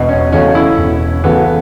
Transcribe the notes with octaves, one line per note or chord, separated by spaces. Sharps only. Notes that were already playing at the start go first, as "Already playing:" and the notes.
Already playing: E1 B2
C#4
E2 C#3 A3 C#4 F#4
E4
E1
E2 C#3 A3 B3 F#4